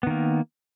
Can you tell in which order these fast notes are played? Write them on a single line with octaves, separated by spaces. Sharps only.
B3 D#3 A#3